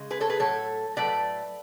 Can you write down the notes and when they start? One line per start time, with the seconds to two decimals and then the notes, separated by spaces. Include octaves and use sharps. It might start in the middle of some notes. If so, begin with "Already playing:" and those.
Already playing: C#3 G#3
0.10 G#4 B4
0.20 A4 C#5
0.29 G#4 B4
0.39 A2 F#3 A3 A4 C#5
0.96 A2 F#3 A3 B4 D5